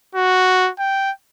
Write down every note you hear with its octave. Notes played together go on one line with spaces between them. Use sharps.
F#4
G5